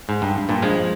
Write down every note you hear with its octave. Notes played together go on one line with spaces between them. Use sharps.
G#2
G2
G2 A#2
F3 G#3